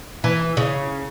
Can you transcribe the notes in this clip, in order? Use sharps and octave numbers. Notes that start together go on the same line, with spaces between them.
E3
C#3